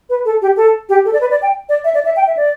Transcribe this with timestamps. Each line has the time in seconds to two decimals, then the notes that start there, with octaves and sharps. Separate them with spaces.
0.10 B4
0.25 A4
0.42 G4
0.57 A4
0.89 G4
1.05 A4
1.13 D5
1.21 B4
1.31 D5
1.42 G5
1.69 D5
1.84 E5
1.94 D5
2.05 E5
2.16 G5
2.27 E5
2.37 D5